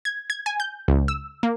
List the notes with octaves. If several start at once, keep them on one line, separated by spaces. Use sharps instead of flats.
G#6
G#6
G#5
G6
C#2
E6
A#3